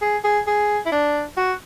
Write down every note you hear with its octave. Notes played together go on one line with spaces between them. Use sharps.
G#4
G#4
G#4
E4
D4
F#4